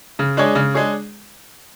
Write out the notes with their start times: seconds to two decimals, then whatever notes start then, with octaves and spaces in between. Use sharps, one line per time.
0.19 C#3
0.37 G#3 D4 G#4 C#5
0.55 C#3
0.74 G#3 D4 G#4 C#5